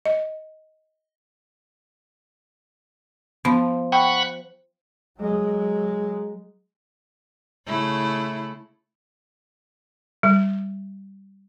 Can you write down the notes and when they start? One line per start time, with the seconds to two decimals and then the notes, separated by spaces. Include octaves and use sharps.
0.06 D#5
3.45 F3 B3
3.92 F#5 G5 B5 C#6
5.19 F#3 G#3
7.67 C#3 A3 E4
10.23 G3